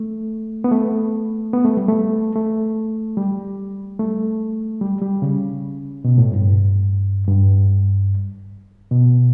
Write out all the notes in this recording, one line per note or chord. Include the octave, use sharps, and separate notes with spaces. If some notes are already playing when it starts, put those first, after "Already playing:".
Already playing: A3
B3
A3
B3
A3
G3
A3
A3
G3
A3
G3
G3
C#3
B2
A2
G2
G2
B2